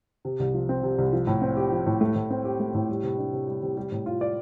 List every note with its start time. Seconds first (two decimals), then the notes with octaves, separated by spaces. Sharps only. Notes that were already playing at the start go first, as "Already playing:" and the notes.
0.25 C3
0.40 C2
0.54 F3
0.69 C4
0.83 C3
0.98 C2
1.13 F3
1.27 A2
1.42 C4
1.57 G4
1.72 F3
1.86 A2
2.01 A3
2.16 A2
2.30 C4
2.45 G4
2.60 A3
2.74 A2
2.89 G3
3.03 C3
3.18 D4
3.33 C3
3.48 G3
3.63 C3
3.77 G3
3.92 A2
4.06 F4
4.21 D5